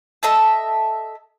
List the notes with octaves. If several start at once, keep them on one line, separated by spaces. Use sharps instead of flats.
A4 D#5 E5 A5